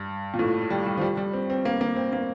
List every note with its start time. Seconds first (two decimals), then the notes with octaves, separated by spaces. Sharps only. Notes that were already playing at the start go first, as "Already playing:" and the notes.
Already playing: G2
0.34 A#2
0.39 A2
0.70 G3
0.86 G3
0.98 F3
1.01 G3
1.17 G3
1.33 C4
1.50 C4
1.65 A#3
1.81 A#3
1.96 C4
2.13 A#3